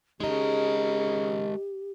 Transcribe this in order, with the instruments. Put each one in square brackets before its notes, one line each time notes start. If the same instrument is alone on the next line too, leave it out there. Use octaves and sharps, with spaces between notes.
[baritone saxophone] C#3 [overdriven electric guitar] G#3 A#4 [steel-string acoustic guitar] D#4 D#5 [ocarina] G4